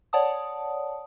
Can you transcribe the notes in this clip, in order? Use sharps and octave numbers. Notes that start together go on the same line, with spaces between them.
C#5 D5 F#5 A5 D#6